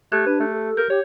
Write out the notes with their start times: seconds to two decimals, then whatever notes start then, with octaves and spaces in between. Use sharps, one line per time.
0.12 A3 G4 F#6 G#6
0.26 D4 B4
0.40 A3
0.52 A4
0.77 A#4 G6
0.90 G4 C#5